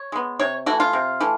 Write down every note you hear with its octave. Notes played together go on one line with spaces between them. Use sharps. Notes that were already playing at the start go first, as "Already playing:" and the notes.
Already playing: C#5
G#3 B3
C3 C#5
E3 A3 F#4
F4
C3
E3 A3